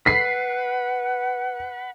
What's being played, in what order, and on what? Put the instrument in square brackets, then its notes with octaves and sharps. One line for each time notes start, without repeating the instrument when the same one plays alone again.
[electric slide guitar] B4 [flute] F#5 [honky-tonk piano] B6 C7